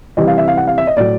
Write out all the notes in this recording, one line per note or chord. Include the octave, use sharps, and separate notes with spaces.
C3 E3 G3 D#5
F5
E5
F5
F#5
F5
E5
D#5
A2 F#3 D5